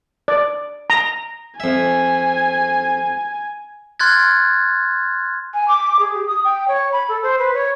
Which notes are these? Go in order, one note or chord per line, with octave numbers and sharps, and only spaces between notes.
D5
A#5
F2 E5 G#5
C6 F6 F#6 G#6 A6
G#5
D6
G#4
G4
D#6
G5
C#5
B5
A4
C5
B4
C#5